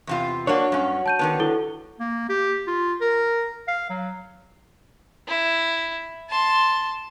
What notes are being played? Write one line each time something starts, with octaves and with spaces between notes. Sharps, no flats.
E2 C3 F4
A#3 D4 F#4 C#5
G2 C#4
A5 G6 D#7
D3 D#3 B3 A5
E4 A4 G7
A#3
G4
F4
A#4
F5
F#3
E4
A5 C6